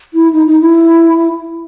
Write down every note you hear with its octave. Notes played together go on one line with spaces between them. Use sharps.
E4
D#4
D#4
E4